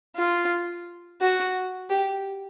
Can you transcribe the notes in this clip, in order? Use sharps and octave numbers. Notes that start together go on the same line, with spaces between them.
F4
F#4
G4